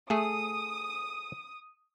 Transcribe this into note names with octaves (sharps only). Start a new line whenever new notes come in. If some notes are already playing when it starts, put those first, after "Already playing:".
A3 G#4 A4 D#6